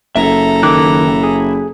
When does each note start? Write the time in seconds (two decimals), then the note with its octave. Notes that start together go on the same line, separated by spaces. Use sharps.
0.16 F#1 A4 E5 A#5
0.63 D#3 E4 D6 F#6
1.23 G#4